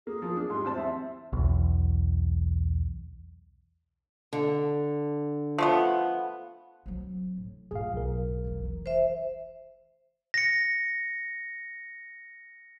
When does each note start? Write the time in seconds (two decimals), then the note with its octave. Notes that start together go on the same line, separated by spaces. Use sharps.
0.07 A#3 G#4
0.22 F3
0.37 D4
0.50 G#2 G3 C6
0.65 E2 C4 A5
0.76 E5
1.33 B1 E2
4.33 D3
5.58 F3 A3 B3
6.86 F#3 C4
7.36 A2
7.71 A2 F4 G#4 F5
7.93 B1 A#4
8.44 F1 E3
8.86 C5 E5
10.34 A#6 C#7